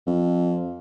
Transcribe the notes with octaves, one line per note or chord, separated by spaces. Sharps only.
F2